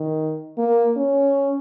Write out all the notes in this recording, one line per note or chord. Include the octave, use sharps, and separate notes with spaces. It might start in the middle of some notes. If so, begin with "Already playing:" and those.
Already playing: D#3
A#3
C#4